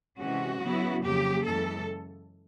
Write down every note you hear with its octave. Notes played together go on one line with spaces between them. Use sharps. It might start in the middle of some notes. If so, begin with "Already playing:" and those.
C3 E3 G#3 C#4 F#4
C#3 F#3 B3 E4
F2 C#3 F#3 A#3 G4
F#2 C#3 E3 G#3 A4